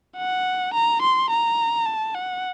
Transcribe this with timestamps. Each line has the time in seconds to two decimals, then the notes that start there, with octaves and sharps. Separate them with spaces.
0.17 F#5
0.74 A#5
1.02 C6
1.31 A#5
1.86 A5
2.15 F#5